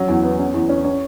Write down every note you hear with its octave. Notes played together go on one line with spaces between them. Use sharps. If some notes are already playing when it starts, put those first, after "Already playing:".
Already playing: F#3 C#4
E2
B3
C#4
E2
C#4
C#4